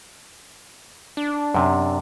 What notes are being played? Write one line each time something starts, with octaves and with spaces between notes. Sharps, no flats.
D4
F#2 C3